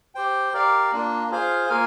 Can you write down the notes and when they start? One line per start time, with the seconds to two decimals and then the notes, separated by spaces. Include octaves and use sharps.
0.15 G4 C5 G5
0.53 G4 A#4 D5 F5
0.93 A#3 D4 F4
1.31 F4 G#4 C5 F5
1.69 A#3 F4 A#4 F5 G#5